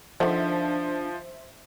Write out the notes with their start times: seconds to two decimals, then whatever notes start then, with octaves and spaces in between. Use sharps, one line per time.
0.20 D3 D#3 F3 D4 C5 E5